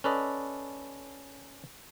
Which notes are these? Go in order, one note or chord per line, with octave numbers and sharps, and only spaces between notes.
C#4 A4 B4 D5 D#5